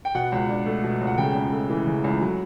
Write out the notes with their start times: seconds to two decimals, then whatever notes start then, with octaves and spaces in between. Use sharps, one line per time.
0.05 G5
0.15 B2 F#5
0.32 C#2
0.49 D4
0.66 A3
0.84 B2
1.01 C#2
1.07 F#5
1.18 C#3 G5
1.35 C#2
1.52 A3
1.70 E3
1.87 C#3
2.04 C#2
2.21 F#3